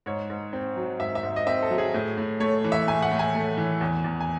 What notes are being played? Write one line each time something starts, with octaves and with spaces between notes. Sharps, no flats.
G#2 C#5
G#2
C4
F#3
G#2 E5
E5
G#2
D#5
C4 E5
A4
F#3
G#4
A2
A2
A3 C#5
E3
E5
A2 G#5
F#5
A2
G#5
A3
E3
E2
E2
G#5